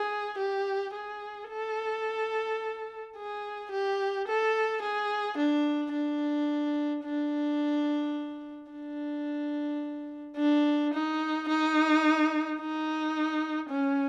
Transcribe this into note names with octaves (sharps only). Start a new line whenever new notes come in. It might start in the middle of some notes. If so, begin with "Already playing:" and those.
Already playing: G#4
G4
G#4
A4
G#4
G4
A4
G#4
D4
D4
D4
D4
D4
D#4
D#4
D#4
C#4